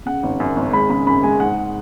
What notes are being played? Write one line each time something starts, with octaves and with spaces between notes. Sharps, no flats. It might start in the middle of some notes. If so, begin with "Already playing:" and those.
C#3 F#5
G#1
F#2
G#1
G#3 B5
C#3 B5
F#2 B5
G#3 G#5
G#2 F#5